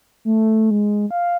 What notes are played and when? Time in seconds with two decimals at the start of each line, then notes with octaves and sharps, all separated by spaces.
0.25 A3
0.71 G#3
1.11 F5